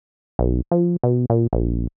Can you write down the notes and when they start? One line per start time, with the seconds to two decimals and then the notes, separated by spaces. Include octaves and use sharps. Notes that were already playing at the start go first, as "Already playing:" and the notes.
0.39 B1
0.71 F3
1.03 B2
1.30 A#2
1.53 A#1